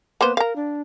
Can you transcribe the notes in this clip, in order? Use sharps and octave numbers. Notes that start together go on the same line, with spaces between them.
A#3 B3 B4 C5
A#4 F5 A#5
D4